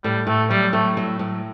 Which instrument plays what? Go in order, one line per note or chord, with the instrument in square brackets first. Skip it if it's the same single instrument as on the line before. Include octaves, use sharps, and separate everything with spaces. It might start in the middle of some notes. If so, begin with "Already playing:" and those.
[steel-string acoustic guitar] A2 [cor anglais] G3
[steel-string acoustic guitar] A2 [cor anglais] A3
[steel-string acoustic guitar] F#3 [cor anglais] G3
[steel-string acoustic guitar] A2 [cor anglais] A3
[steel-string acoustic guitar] F#3
A2